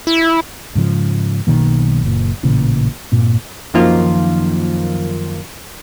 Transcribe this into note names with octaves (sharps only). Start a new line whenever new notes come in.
E4
G#2 C#3 F3
B1 B2 D#3 A#3
F#1 A#2
A1 A#2 C#3 E3
G2 A#2 C4
F#2 D#3 F3 A#3 F4